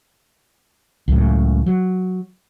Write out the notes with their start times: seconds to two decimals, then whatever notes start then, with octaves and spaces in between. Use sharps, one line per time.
1.08 C#2 F#2 A2
1.66 F#3